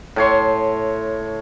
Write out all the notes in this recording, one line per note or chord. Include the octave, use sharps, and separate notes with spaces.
A2 C#5 C6